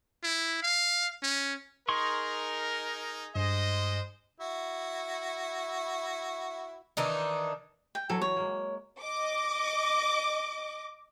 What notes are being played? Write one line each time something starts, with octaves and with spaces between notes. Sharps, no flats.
E4
F5
C#4
D#4 G#4 A#4 C6 C#6
G2 G#3 C5 D#5
E4 F#4
D#3 E3 D4 D#4
G5
E3 F#3 A4
C#5
G#3 A#3
D#5 D6